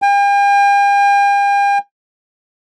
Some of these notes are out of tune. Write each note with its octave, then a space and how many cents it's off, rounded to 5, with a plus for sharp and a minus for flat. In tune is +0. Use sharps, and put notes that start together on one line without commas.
G5 +45